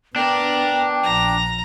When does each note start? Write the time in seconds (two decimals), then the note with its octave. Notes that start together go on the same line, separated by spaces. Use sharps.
0.16 B3 D4 A#4 G5
1.03 A#1 F3 A#5